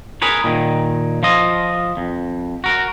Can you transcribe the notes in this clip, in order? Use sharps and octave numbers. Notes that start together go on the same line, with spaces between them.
G#4 A#4 B4 C#5
A#2 D#3
F3 F4 D#5
F2
F#4 A#4